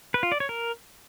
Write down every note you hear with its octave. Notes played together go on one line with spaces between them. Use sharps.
B4
F4
D5
C#5
A#4